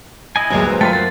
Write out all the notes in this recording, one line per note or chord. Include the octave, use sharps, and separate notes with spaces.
E4 D#5 G#5
D2 G2 F#3 G#3 A#3 B3
B4 C5
F#2 A3 A#3 F4 B4 G5 A6
F#3 C5 A6